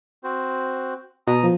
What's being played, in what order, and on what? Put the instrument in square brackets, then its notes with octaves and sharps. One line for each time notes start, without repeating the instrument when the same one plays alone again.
[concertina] C4 F#4 C5
[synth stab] B2 [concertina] A#5 D#6
[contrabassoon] F3